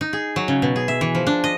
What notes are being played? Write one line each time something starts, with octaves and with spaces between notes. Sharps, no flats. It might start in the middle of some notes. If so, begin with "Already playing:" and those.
D#4
G#4
F#3
C#3
B2
G#4
E5
E3
F3
D4
D#5